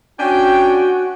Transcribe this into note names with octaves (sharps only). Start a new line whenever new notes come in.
C#4 D4 F#4 G5